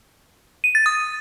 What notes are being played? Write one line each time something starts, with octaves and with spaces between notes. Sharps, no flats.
D#7
A6
D#6